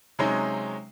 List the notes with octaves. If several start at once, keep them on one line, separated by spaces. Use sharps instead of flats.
C3 F#3 G#3 C#4 D#4